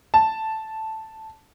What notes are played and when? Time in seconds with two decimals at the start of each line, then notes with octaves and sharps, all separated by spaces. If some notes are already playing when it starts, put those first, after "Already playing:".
0.14 A5